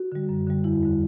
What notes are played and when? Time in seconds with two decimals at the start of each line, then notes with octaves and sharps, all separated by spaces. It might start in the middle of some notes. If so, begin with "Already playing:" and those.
Already playing: F#4
0.12 D3 G3
0.29 F#2
0.47 D3 G3
0.64 E2 E4
0.83 D3 G3